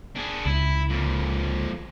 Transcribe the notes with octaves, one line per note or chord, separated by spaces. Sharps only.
D4 G#4
C#2 E4
F2 A#2